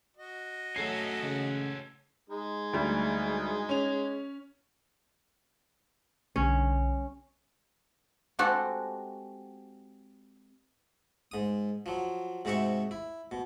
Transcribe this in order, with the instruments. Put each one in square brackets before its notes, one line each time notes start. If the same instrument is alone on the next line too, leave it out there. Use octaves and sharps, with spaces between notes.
[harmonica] F#4 D#5
[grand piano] F#3 A3 C7 [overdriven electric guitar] C#4 A4
[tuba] C#3
[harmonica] G#3 D#4
[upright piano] D2 G3
C#4 F7
[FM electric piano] B1 D3 G3 [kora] C#4
[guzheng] G#3 C4 F#4 G4 A4
[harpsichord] G#2 D#6
F3 F#3
G#2 C3 D#4 F#4 E5 C#6
E4
B2